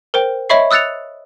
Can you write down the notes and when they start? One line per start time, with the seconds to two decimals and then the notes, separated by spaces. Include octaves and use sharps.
0.14 A#4 C5 G5
0.49 C#5 D#5 E5 B5 C#6 C7
0.71 D#6 E6 F#6 A6 C#7 F7